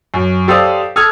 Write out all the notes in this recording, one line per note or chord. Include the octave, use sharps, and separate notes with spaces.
F#2
G4 A4 C5 D5 F5 D#6
A4 D#6 F6 G#6